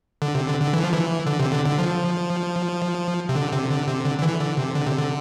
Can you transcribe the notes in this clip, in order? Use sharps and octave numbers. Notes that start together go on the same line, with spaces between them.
D3
C3
D3
D3
E3
F3
E3
D3
C3
D3
D3
F3
C3
D3
C3
D3
C3
D3
D3
E3
D3
C3
D3
C3
D3